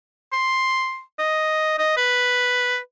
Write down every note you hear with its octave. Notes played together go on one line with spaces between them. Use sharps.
C6
D#5
D#5
B4